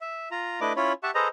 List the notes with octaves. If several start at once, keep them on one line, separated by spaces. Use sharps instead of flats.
E5
F4 A#5
A3 D4 E4 B4 D#5 D6
C#4 E4 F4 C#5 B5
G4 E5 F#5 A5 C#6
G#4 A4 B4 C5 D#5 A#5